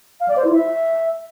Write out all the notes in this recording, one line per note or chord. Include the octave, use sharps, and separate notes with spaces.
F5
D5
C5
E4
E5